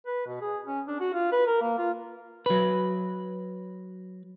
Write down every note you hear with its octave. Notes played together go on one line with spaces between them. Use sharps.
B4
B2
G#4
C#4
D4
F#4
F4
B4
A#4
A#3
F4
F#3 B4